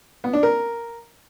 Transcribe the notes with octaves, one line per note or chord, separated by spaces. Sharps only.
B3
D4
A#4